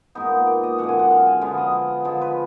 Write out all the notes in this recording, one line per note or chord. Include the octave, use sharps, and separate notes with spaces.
A#2 G#3 B3 D#4
D5
D#5
F#2 D3 G#3 F#5
G#5
F#5
F5
G#5
D3 F3 G#3 B3 F5
D#5
D3 F3 G#3
B4